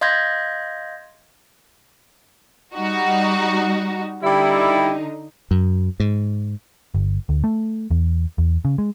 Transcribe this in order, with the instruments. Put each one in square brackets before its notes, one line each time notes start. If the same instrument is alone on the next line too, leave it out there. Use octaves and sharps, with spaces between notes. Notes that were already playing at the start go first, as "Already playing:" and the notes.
[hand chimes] D#5 F5 C6 G6 G#6 A#6
[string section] G3 D#4 F#4
[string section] D3 D#4 [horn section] G3 E4
[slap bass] F#2
G#2
[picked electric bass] G1
D2
A3
E2
E2
C#3
G#3